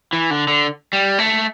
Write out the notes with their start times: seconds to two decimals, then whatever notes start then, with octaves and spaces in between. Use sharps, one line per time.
0.13 E3
0.31 D3
0.48 D3
0.93 G3
1.19 A3